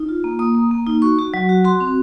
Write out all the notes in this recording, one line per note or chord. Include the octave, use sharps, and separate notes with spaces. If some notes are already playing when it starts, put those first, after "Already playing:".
Already playing: D#4
F4
A#3
A#3 D#6
A#3
A#3
D#4
F#4 C#6
F#4
F#3
F#4
F#4 C6
C4